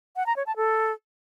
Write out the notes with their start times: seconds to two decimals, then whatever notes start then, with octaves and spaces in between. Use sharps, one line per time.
0.16 F#5
0.26 A#5
0.36 C#5
0.46 A5
0.56 A4